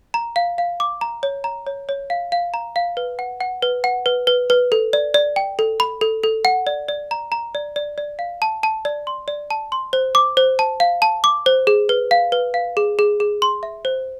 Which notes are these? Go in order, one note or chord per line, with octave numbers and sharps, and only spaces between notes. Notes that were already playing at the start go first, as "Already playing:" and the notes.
A#5
F5
F5
D6
A#5
C#5
A#5
C#5
C#5
F5
F5
A#5
F5
B4
F#5
F#5
B4
F#5
B4
B4
B4
A4
D5
D5
G5
A4
B5
A4
A4
F#5
D5
D5
A#5
A#5
D5
D5
D5
F5
A5
A5
D5
C6
D5
A5
C6
C5
D6
C5
A5
F5
A5
D6
C5
G#4
B4
F5
B4
F5
G#4
G#4
G#4
C6
E5
C5